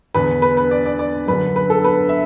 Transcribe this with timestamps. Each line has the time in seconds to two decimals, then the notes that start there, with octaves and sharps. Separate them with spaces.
0.14 E2 D3 B4
0.42 B4
0.57 B4
0.71 D5
0.86 D5
0.99 D5
1.28 F#2 D3 B4
1.56 B4
1.70 A4
1.84 B4
2.09 E5